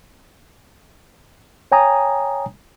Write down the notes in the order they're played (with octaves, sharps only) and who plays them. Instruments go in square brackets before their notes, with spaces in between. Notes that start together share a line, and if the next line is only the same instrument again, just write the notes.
[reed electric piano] C#5 G5 G#5 A#5 D#6